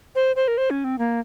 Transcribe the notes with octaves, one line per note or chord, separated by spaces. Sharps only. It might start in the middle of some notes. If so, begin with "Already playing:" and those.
C5
C5
A#4
C5
C#4
C4
A#3